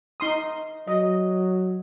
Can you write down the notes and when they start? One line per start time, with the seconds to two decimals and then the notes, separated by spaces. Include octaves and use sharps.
0.20 D#4 C6 D#6
0.87 F#3 D#5